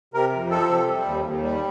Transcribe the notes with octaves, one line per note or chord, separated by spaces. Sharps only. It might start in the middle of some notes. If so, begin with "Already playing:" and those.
C3 A#4
F2
F3 A4
C3
G3
D#2
D#2
G3